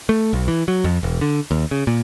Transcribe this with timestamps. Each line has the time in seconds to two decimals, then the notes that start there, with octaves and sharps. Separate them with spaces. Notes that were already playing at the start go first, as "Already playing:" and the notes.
0.09 A3
0.33 B1
0.48 E3
0.68 F#3
0.84 F2
1.03 E1
1.21 D3
1.51 D#2
1.71 C#3
1.87 A#2